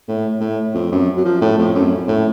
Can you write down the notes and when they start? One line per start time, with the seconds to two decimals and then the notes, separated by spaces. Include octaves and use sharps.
0.08 A2
0.40 A2
0.75 F2
0.92 F#2
1.17 F#3
1.25 F3
1.41 A2
1.59 F2
1.75 F#2
2.08 A2